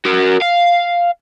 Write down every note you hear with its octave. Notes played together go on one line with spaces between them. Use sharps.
F#4 A#4
F5